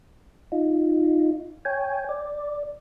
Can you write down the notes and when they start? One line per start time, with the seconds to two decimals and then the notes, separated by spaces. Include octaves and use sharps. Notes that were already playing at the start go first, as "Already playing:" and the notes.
0.52 D#4 F4
1.65 C#5 G5 G#5
2.09 D5